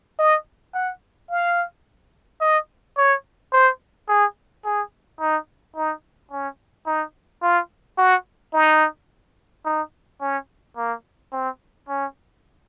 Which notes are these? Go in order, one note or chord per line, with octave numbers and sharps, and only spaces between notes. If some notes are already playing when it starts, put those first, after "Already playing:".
D#5
F#5
F5
D#5
C#5
C5
G#4
G#4
D#4
D#4
C#4
D#4
F4
F#4
D#4
D#4
C#4
A#3
C4
C#4